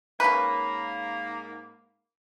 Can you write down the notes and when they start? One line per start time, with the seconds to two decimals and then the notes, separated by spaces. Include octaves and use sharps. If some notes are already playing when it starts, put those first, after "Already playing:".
0.20 G#2 A#3 C#4 B4